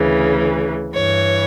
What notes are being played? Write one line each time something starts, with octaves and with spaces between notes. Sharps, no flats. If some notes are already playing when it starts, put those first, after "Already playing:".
Already playing: D2 C#3 E3
G2 E3 C#5